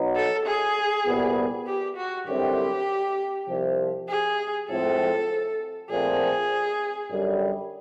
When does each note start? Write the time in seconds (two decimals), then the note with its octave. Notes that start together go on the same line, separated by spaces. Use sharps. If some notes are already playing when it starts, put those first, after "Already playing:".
Already playing: B2 F#3 B3 D#4
0.15 A4
0.45 G#4
1.06 C2 A#2 G3 B3
1.66 G4
1.97 F#4
2.27 F#2 D3 G3 C4 E4 G4
3.48 C2 C3 F3
4.09 G#4
4.69 A2 F3 G#3 C4 A4
5.90 A#2 F3 A3 C4 G#4
7.11 F#2 D3 G3